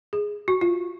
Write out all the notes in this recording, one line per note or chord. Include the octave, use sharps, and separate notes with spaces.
G#4
F#4
F4